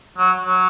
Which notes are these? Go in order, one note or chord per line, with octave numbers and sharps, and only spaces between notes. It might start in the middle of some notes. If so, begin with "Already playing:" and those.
F#3
F#3